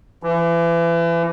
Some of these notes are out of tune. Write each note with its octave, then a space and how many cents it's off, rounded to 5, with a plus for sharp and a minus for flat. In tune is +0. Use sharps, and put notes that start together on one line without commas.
E3 +35